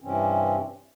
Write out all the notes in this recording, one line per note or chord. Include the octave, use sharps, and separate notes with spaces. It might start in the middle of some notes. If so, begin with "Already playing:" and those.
G2 C3 E3 C4 C#4